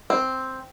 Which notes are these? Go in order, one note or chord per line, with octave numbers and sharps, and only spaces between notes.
C4